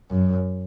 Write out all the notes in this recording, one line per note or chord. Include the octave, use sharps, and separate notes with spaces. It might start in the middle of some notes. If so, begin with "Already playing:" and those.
F#2